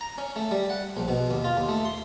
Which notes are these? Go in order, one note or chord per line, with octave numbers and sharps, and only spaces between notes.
A#5
C#4
A3
G3
F#5
A#1
B2
D#2
F4
D#2
A3
C6